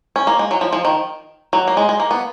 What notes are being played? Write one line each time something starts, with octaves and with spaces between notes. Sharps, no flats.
C#4
A#3
G#3
F#3
F3
F3
D#3
F#3
A#3
G#3
G#3
A#3
B3